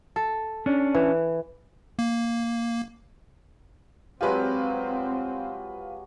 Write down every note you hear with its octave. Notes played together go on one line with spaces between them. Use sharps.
A4
C#4 D4
E3
A#3
F#3 G#3 C4 F4 G4 B4